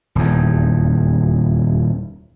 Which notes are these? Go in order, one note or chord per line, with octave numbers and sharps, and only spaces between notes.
D#1 E2